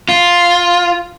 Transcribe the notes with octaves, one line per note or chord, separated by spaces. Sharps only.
F4